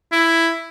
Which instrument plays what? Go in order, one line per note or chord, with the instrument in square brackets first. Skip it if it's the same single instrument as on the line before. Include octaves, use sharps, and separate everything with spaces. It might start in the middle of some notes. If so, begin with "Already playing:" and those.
[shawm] E4